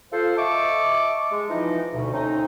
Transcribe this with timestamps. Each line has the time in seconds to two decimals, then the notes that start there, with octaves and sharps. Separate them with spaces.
0.12 F4 A4 C5
0.37 D#5 E5 A5 C#6 D6
1.31 G#3
1.50 E3 F3 D#4
1.93 D2 B2
2.13 A3 C4 C#4 D#4